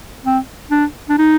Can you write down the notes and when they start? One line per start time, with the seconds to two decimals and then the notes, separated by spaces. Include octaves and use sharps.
0.25 C4
0.71 D4
1.10 D4
1.18 D#4